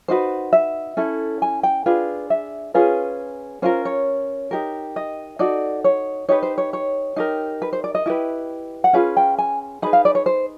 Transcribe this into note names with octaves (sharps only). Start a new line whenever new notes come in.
D#4 F#4 B4 C5
E5
C#4 E4 A4
G#5
G5
D4 F4 G#4 B4
E5
C#4 F4 G#4 B4
C#4 F4 A#4 C5
C#5
D#4 G4 A#4
D#5
D#4 F#4 A4 D5
C#5
D#4 G4 B4 C#5
C5
C#5
C#5
D#4 G4 A#4
B4
C5
D5
D#5
E4 G4 B4
F#5
C#4 F4 G#4 B4 F5
G5
G#5
D#4 G#4 B4 B5
F5
D5
C#5
C5